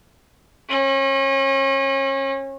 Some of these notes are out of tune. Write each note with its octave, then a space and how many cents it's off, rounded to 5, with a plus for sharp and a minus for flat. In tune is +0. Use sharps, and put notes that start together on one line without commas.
C#4 -35